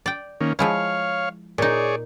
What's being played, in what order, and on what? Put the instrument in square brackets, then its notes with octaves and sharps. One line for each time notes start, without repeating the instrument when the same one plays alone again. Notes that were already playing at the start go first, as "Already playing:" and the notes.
[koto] D5 G5
[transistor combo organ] D#3 A#3 C#4
[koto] F3 G#3 E4 [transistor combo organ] C#5 F5
[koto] A#2 D#4 [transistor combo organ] G#4 C#5 D5